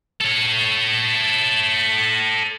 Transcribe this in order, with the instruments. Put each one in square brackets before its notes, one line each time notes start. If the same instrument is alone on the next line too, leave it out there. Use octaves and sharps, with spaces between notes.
[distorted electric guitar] A4 C#5